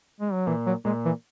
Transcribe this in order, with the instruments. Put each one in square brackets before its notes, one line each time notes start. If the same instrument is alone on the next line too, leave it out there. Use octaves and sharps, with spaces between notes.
[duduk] G#3
F#3
[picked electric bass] A#2 [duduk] E3
[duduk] F#3
[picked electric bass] A#2 [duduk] G#3
[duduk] E3